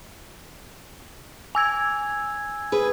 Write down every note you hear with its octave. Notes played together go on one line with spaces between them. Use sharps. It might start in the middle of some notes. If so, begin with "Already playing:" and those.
G#5 E6 G#6
G#4 B4